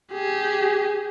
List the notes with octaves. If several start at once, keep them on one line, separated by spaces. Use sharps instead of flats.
G4 G#4